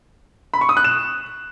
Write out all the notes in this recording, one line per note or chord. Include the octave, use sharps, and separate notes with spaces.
B5
C#6
D#6
F#6
E7